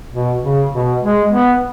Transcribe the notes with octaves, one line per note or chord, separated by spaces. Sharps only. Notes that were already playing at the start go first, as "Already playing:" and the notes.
B2
C#3
B2
G#3
B3